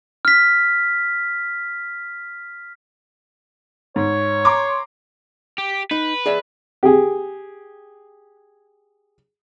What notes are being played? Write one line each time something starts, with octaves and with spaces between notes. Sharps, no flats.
F6 B6
G#2 C#5
A#5 C6 D6
G4
D#4 B4
G#4 D5 E5
G4 G#4